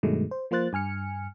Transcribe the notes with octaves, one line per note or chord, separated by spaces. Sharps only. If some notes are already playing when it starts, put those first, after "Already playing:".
G2 B2 D#3 F#3 G#3 A3
C5
F3 A#3 F4 C5 F#6 A6
G2 G#5 F6 C#7